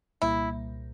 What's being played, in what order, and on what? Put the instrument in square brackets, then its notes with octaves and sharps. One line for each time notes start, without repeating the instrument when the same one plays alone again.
[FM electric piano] C2 A#2 G3 A#3 [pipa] E4